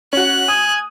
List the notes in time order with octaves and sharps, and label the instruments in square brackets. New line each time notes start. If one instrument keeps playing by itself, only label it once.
[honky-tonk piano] C#4 F#4 [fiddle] F#6
[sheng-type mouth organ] G#5 [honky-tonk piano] D#6